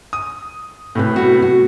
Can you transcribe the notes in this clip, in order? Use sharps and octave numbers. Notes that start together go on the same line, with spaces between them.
D#6
A2 C3 B4
B3 F#4
F#4